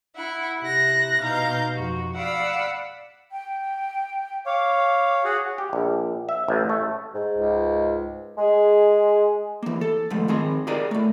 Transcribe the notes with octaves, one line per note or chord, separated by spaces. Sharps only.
E4 F#5
C3 E4 F#6 A#6
B2 D#4 F5 A#5 G6
F2 F#4
D5 F5 F#5 B5 E6
G5
C#5 F5 D6
F#4 G#4 F#5
G4
A#1
E5
A1
A3
G#2
C#2
G#3 G#4
E3 A#3
A4
D#2 G#2 F3 G#3 A3
D#3 C4 G#4 D#5
G4 G#4 A#4 D5 D#5
A2 A3